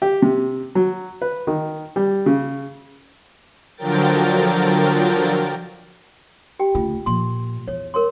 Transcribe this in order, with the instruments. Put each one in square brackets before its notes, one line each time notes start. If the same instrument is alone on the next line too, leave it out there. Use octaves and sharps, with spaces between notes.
[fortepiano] G4
C3
F#3
B4
D#3
G3
C#3
[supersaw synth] D3 F3 F#3 A#4 G5 A6
[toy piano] G4 G5
[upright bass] D2 C#3 [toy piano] F4
[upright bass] A#2 F3 [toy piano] C6
[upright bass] E2 [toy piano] C#5
[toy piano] A#4 C#5 C6